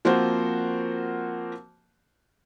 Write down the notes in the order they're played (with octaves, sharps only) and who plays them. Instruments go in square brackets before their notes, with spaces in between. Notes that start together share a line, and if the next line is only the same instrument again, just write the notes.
[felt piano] F3 A#3 C4 F#4 C5